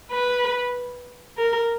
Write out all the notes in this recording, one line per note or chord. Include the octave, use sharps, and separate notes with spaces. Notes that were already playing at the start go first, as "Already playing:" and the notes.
B4
A#4